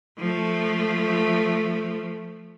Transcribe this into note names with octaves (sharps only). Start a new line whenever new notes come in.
F3 A3